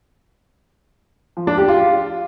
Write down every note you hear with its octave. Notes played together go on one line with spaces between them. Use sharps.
F3
D4
G4
F4